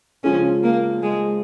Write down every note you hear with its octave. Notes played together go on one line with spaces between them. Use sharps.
C#3 F3 G#3 C#4 F4 G#4
A#3
G#3